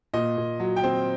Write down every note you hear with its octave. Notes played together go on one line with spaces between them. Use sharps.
A#2 D#5
A#2
F#3
G5
C4